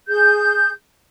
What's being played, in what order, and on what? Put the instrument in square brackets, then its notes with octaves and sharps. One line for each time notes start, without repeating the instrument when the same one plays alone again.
[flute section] G#4 G6